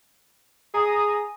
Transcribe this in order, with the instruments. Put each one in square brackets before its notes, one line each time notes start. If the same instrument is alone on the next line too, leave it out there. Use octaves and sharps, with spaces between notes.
[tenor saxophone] G#4 [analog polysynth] A#5 D#6